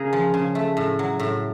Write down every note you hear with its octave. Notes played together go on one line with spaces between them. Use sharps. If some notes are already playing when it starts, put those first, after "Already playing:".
Already playing: C#3 G#4 A#4
F3
C#3
A3
A2
F#3
A2